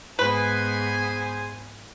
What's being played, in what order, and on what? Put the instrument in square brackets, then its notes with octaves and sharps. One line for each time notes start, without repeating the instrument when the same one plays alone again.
[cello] G#2 B3 [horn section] G#4 C5 G#5 [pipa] B4